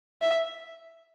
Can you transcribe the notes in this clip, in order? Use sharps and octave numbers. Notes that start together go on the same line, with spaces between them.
E5